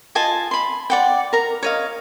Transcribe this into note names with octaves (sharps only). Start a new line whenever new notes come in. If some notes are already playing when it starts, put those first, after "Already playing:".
F4 D#5 G#5 A5
B5 C6
D5 F#5 G5
A#4 A#5
C#5 D#5 F5